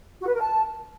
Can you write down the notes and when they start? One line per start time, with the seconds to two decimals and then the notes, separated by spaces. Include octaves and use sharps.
0.21 F#4
0.27 B4
0.34 A#4
0.40 A5